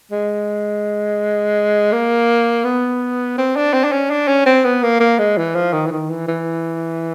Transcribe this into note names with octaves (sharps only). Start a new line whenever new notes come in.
G#3
A#3
B3
C4
D4
C4
D4
C#4
D4
C#4
C4
B3
A#3
A#3
G#3
E3
F3
D#3
E3
D#3
E3
E3